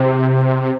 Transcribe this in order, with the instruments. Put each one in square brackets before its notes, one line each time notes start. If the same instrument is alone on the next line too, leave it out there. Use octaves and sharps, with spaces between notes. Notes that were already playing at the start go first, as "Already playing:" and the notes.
Already playing: [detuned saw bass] C3 [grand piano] C5